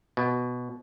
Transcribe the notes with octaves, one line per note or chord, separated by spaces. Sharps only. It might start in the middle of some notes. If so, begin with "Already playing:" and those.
B2